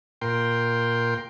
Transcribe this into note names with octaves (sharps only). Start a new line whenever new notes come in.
A#2 A#4 G5 C6